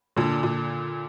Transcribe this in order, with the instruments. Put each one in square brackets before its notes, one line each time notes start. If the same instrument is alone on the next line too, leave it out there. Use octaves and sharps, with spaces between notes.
[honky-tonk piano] A#2 [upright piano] D3
[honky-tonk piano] A#2